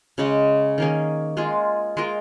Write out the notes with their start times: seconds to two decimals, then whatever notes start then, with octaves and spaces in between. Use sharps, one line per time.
0.18 C#3 G#3 C#4
0.78 D#3 A#3 C#4 G#4
1.37 G#3 F4 G#4
1.97 G#3 F4 A#4